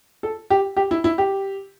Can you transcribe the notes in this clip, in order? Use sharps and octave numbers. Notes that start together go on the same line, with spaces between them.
A4
G4
G4
E4
E4
G4